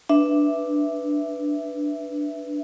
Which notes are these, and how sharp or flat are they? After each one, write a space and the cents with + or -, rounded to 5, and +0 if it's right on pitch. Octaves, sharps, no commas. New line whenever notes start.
D4 +0 B4 +0 E5 +0